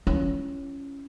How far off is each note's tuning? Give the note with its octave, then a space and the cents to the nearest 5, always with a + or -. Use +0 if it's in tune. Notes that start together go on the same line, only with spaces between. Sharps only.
C#4 +0 E4 +45